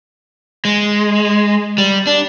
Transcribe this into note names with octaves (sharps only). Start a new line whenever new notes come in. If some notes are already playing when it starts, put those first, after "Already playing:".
G#3
G3
D4